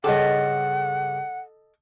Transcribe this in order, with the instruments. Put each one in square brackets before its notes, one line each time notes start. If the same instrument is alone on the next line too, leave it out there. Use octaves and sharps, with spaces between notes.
[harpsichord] G2 C#3 G4 [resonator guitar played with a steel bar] A4 D#5 [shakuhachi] F#5